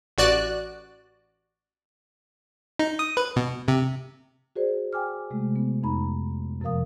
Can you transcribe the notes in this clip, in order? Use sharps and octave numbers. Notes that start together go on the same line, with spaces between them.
A1 F#4 D5 F#6
D#4
D#6
B4
B2
C3
F#4 G#4 C5 D5
G5 G#5 D6 F6
C3 G#3 A3
B3
F2 D#4 A#5 B5
F#2 C3 F3 A#4 F5 D#6